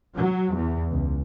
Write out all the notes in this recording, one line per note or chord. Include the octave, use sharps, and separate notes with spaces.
F#3
E2
C#2